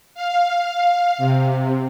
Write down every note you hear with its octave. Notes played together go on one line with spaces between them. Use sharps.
F5
C3